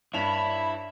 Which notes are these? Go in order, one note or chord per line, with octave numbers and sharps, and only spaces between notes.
G2 D4 E4 C#5 A5 B5 F7